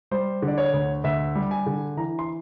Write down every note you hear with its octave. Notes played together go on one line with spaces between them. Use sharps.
G3 C5
D3
D5
C#5
D2
D2 E5
G3
G#5
D3
E3 A#5
C6